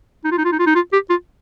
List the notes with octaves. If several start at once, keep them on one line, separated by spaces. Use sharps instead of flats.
D#4
F4
D#4
F4
D#4
F4
D#4
F4
G4
F4